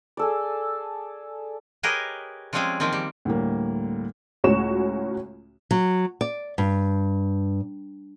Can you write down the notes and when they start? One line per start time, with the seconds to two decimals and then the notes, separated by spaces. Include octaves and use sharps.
0.17 G#4 A4 D5
1.83 G4 G#4 A#4 B4 C#5 D#5
2.53 F3 G3 G#3 C4 C#4 G#4
2.80 D#3 F3 A#3 C4
2.93 G3
3.25 D2 A2 G3 A#3
4.44 C#2 A2 C#4 F#4 C#6 E7
5.71 F#3
6.21 D5
6.58 G2